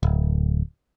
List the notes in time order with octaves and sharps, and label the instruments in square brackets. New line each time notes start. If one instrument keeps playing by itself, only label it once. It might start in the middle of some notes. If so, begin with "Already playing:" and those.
[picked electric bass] D1